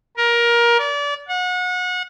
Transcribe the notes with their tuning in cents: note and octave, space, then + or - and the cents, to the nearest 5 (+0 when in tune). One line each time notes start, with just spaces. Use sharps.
A#4 +20
D5 -30
F#5 -30